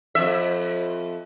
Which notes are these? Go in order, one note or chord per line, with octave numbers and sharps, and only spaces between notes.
F2 E5